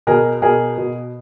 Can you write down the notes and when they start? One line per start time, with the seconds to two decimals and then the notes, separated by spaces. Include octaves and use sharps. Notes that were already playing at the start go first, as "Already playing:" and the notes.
0.07 B2 G#4 A#4
0.42 B2 G#4 A#4
0.77 B2